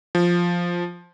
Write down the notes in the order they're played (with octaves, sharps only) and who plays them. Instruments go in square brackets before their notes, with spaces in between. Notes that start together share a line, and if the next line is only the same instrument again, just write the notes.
[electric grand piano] F3